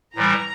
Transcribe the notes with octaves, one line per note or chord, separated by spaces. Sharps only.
A2 E3 G3 A#5